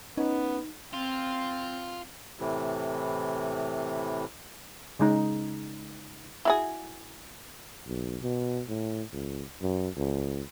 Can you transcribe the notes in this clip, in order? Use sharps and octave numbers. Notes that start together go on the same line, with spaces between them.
B3 C#4 D#4
C4 F4
A2 C3 E3
C#3 G#3 D#4
E4 F#4 G#4
B1
B2
A2
C#2
F#2
C#2